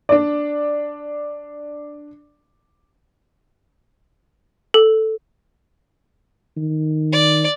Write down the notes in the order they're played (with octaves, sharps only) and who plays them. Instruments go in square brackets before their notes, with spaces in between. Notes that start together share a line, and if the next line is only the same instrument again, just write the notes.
[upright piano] D4 D5
[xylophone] A4
[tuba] D#3
[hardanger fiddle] D5